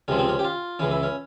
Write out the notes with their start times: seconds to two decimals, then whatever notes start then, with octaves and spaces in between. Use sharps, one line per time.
0.08 C#2 C3 F3 G#3 C#4
0.19 C4
0.29 C#4
0.39 G4
0.44 F4
0.79 C#2 C#3 E3 C#4
0.91 E4
1.03 C#4